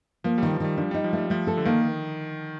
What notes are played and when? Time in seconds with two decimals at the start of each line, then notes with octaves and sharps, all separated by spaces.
0.24 F3 A#3
0.38 D#3 G3
0.51 F3
0.60 D#3 G3
0.77 F3 D4
0.91 G3 D#4
1.04 F3
1.13 G3 A3
1.30 F3 A3
1.47 A4
1.57 D3
1.65 D#3 A#3